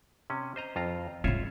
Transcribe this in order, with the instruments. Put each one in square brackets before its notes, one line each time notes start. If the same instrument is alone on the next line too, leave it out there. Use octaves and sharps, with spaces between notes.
[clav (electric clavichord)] C3 C#4
C5 D#5 A#5
F2 F4 A#5
[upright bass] G#2 C4 [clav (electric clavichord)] F4 C#5 E5